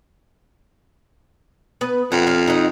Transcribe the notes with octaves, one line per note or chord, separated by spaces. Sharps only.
B3 B4
F2 F#5
F5
D#4 F#5